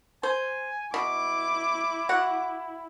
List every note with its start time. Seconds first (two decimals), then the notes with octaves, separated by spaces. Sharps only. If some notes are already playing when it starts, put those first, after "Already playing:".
0.23 C5 G#5
0.94 B2 E4 D6
2.09 F#4 F#5